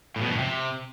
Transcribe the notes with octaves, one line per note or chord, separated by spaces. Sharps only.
A2
B2
F2
A2
C3